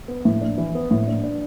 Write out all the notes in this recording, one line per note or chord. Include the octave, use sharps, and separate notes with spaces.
B3
A2
D4
E3
B3
A2
D4
D4